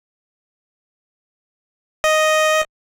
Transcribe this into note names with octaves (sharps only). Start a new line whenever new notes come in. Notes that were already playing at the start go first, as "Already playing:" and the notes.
D#5